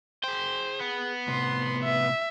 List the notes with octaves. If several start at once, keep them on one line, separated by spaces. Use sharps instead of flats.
G#4 C5 G5
B3
A2 C3 C6
E5